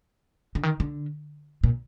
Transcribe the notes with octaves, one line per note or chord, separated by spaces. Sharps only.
D3
D#3
D3
A#2